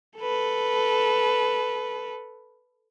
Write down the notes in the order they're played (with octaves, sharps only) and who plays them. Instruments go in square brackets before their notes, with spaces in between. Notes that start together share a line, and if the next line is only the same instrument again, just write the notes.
[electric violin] A4 B4